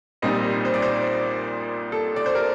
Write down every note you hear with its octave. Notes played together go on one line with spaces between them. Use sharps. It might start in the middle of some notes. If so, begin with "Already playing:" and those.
A#1 A#2 G3 C4 D#4 D#5
C5
D5
C5
A4
D5
C5
A#4